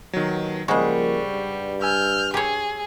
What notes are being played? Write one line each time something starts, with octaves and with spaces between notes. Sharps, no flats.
D#2 B2 D#3 F#3
C#3 F3 G3 G#3 A#3 C5 F#5 C#6
G2
G#5 E6 F6 G6
G4 G#4 C#5